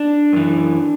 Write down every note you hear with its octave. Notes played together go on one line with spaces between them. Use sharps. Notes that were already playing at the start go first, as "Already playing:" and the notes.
Already playing: D4
F#2 E3